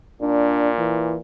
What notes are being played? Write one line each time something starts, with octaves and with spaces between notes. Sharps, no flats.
A#2 D4
E3